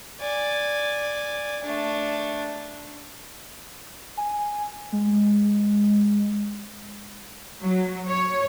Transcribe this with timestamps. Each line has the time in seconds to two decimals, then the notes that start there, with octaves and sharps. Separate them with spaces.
0.21 D5 G#5
1.63 A3 D4
4.17 G#5
4.92 G#3
7.61 F#3
8.08 C#5